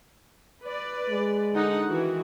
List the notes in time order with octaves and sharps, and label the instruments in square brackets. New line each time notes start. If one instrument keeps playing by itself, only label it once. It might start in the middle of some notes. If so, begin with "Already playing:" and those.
[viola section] B4 D5
[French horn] G#3
[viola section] D3 D#4 F#5
D#3 E3 F#4